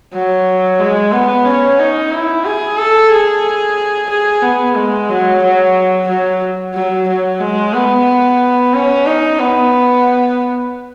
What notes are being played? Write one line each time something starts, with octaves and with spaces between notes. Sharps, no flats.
F#3
G#3
B3
C#4
D#4
E4
G#4
A4
G#4
G#4
B3
G#3
F#3
F#3
F#3
F#3
F#3
G#3
B3
C#4
D#4
B3